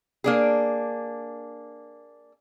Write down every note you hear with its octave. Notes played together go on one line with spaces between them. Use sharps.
A#3 D4 G#4